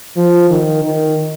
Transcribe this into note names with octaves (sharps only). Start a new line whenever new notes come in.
F3
D#3
D#3